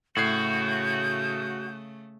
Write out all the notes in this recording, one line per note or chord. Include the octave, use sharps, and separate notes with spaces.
A2 C#3 A3 F#4 G6 G#6 C7